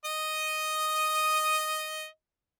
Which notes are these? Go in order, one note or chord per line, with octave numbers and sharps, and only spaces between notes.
D#5 D#6